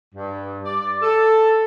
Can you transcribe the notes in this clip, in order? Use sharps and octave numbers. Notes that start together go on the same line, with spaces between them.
G2
D5
A4